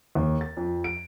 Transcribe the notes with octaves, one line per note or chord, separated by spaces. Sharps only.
D#2
A6
F2
D7